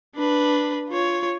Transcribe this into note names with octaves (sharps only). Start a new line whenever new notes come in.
D4 B4
F4 C#5